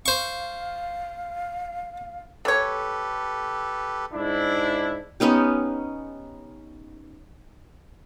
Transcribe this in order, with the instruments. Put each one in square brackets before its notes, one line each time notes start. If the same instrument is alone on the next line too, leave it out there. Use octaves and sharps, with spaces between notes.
[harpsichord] C5 C#6 [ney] F5
[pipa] A3 C#5 [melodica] G4 A4 B4
[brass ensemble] G#2 D4 E4
[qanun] B3 C#4 D#4 G4